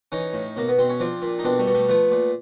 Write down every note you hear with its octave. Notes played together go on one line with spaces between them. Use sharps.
E3 C#4 D#4
A2
B2 A#3
B3
B2 C4
C#4
F3 C4 D4
A#2
D#4
B2 C4 D4
G3 A3
B2
G3 A3
F3 A3 B3
A#2